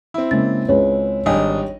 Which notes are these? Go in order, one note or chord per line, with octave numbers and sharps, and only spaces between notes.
C4 E4
C#3 G#3 A#3 A6
C#2 G#3 B4 C#5
G#1 G3 D4 D#5 G5 G#5